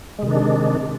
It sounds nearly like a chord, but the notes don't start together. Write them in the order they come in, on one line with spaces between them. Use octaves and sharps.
G#3 C3 D#3 D4